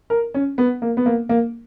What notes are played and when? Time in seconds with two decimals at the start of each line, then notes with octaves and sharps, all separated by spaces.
0.10 A#4
0.34 C#4
0.58 B3
0.82 A#3
0.97 B3
1.06 A#3
1.29 A#3